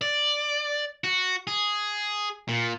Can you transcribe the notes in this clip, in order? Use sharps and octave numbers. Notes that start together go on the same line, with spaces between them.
D5
F#4
G#4
A#2